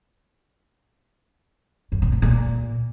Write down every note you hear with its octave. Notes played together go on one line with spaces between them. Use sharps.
F#2
A#2
A2
A#2